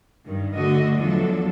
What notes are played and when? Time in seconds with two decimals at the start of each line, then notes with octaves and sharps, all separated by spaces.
0.24 G2 D#3
0.56 D3 A3 F#4 D#5
0.96 E2 F3 F#3 D4 A4